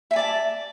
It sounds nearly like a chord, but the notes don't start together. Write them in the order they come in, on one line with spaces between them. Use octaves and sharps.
E5 G#5 D5 A5